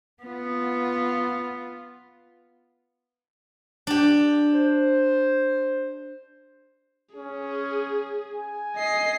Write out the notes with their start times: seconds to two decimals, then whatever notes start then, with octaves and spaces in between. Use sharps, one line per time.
0.24 B3 F4
3.87 D4 G4
4.54 C5
7.16 C#4 G#4
8.36 G#5
8.77 D#5 C7